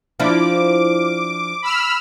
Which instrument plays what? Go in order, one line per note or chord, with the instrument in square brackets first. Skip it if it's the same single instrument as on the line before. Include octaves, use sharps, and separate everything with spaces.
[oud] F3 D4 E4 [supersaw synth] D6
[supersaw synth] B5 E6 F6